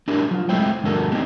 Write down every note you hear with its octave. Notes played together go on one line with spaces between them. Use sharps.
D4 E4 G4 A#4
F#3 F4
G#3 A3 C4 E4 C5 G5
D2 G2 F#4 A4 A#4
A#3 C4 D4 D#4 G4